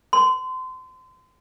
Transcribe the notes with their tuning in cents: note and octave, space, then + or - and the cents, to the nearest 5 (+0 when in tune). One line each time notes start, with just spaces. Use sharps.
C6 -30